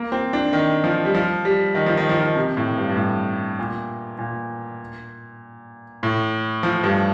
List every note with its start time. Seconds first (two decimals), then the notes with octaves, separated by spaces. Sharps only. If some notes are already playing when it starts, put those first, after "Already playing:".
Already playing: A#3
0.12 C4
0.33 D4
0.53 D#3
0.84 F3
1.05 G3
1.14 F3
1.45 G3
1.75 D#3
1.86 F3
1.97 D#3
2.09 F3
2.21 D#3
2.36 C3
2.57 A2
2.77 G2
2.89 G2
2.97 A2
3.59 A#2
4.19 A#2
6.03 A2
6.63 F3
6.84 G2